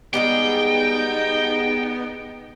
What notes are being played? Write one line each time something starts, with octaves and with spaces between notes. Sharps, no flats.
G3 G#3 B3 D#4 G#4 G5